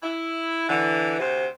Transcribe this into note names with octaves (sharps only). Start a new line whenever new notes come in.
E4
D3 E3
D2 C3 C5